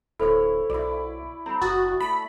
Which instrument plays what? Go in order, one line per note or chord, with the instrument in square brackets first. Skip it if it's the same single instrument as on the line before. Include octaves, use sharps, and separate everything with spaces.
[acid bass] D1 [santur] E4 C#5 [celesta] A4 C5
[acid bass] B1 [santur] E4 D5
[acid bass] C4 [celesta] A#5 B5
[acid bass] F#1 [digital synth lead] F#4 [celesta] D#6 A6
[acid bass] A3 [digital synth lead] B5